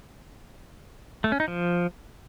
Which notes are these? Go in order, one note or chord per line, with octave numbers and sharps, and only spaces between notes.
A3
C#4
D#4
F3